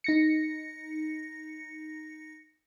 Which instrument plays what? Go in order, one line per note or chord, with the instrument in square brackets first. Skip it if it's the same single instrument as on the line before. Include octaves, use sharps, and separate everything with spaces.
[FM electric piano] D#4 A#6 C#7